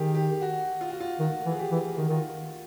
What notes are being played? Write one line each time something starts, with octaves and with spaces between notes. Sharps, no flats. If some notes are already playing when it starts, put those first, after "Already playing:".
Already playing: D#3 G4 G#4
G4
F#4
F4
F#4
F4
D#3 F#4
E3
G#4
G4
E3
D#3 F#4
D#3 F4